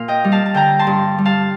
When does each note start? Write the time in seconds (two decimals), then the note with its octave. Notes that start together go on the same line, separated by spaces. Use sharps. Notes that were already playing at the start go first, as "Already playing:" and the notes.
Already playing: A#2 F5
0.08 D#5 G5
0.24 G3
0.32 F5 A5
0.46 A5
0.54 D3 G5 A#5
0.79 A5 C6
0.87 G2
1.18 G3
1.25 F5 A5